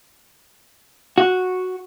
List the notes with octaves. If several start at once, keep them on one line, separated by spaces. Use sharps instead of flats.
F#4